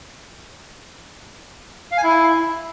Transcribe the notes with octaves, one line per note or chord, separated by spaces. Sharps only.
F5
G#5
E4